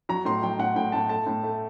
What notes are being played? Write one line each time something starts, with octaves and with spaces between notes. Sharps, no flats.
F#3 A#5
A2 C6
F#3 G5
A2 F#5
A2 G5
A2 A5
A3 A5
A2
A3